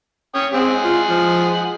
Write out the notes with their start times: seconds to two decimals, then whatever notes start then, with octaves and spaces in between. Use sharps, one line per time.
0.35 C#4 C#5 G5 D#6
0.53 G#3 C4 G#4 F#5
0.84 F4
1.09 F3